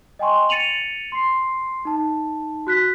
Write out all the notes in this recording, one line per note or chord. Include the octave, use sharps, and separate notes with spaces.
D#5 G5 G#5 C6 C#6
A6 C#7 D#7 F7 F#7
C6 C7
D#4 A5
F#4 F#6 B6